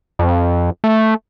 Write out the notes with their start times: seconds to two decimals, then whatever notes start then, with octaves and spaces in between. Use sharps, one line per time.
0.19 F2
0.84 A3